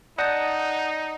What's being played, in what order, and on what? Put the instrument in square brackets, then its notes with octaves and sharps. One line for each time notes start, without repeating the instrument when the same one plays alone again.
[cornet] D#4 [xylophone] D5 G6 A#6 [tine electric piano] F#5 A5 D#6